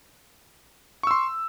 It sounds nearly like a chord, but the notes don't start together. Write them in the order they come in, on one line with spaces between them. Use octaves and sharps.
C#6 E6 C6